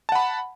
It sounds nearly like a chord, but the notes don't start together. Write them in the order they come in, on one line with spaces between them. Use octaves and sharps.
A5 F#5 B5